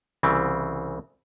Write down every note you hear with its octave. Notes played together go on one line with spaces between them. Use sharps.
C2 C#3 E3 C4